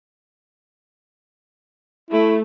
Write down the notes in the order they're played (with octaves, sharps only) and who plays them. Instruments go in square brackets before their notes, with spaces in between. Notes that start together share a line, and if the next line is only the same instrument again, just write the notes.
[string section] A3 [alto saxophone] E4